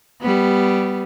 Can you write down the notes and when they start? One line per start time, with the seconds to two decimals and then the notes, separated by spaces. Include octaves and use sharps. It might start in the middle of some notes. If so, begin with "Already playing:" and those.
0.21 G3 B3